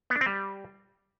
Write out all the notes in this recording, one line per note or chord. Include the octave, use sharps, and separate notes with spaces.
B3
D4
C4
G3